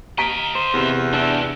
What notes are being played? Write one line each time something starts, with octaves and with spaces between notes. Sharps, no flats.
D#5 F5 A#5 B6 D7
C5
E2 C3
D4 F#4 G4 E5